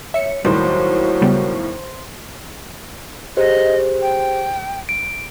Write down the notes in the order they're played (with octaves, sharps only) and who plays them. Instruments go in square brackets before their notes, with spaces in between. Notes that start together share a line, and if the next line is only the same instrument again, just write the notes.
[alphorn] C#5 [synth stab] E5 C#7
[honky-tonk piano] D#2 A2 D#3 [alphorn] F#3 [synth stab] G3 D#4 [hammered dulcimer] C5
[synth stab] C#3 G3 B3
[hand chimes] G4 G#4 C5 [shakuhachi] D#5
[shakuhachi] G5
[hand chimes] D7